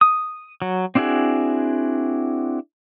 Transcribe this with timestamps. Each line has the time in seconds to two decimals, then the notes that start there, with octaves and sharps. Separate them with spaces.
0.01 D#6
0.62 F#3
0.95 C4 D4 E4 F#4 G#4